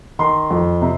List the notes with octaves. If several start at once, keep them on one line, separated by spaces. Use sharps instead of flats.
D#3 C6
F2
C3